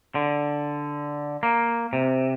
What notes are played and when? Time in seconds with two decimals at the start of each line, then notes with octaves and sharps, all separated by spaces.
0.15 D3
1.43 A#3
1.93 C3